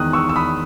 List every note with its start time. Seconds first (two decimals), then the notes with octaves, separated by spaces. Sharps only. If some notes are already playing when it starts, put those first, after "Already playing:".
Already playing: E2 D#3 D#6 F#6
0.13 C#6 E6
0.29 E6
0.36 B5 D#6